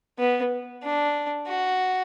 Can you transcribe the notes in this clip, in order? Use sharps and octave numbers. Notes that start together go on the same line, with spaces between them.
B3
D4
F#4